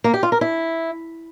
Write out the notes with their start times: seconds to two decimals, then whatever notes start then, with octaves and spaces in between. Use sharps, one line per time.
0.04 A#3
0.14 G4
0.23 F4
0.32 A#4
0.41 E4